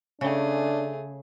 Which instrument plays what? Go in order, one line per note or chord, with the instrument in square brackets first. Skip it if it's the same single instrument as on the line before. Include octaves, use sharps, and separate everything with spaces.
[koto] C#3 [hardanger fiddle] A3 G#4 [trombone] D4